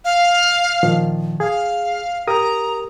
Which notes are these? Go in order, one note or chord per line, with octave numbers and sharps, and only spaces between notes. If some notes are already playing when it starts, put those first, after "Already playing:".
F5
A#2 D#3 F3
G#4 F5
G4 A#4 A#5 D#6